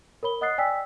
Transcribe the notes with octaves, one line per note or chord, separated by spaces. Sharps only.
A#4 C#5 B5 G7
D#5 F#5 D#6 F#6 A6 C7
D5 G5 G#5 E6 B6